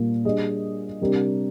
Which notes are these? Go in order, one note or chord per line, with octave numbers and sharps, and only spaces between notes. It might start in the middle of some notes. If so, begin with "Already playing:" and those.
Already playing: A#2 G3 A#3
G3 D4 G#4 D#5
C3 G3 D4 G4 A#4